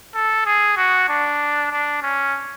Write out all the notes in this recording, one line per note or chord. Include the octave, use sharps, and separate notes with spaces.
A4
G#4
F#4
D4
D4
C#4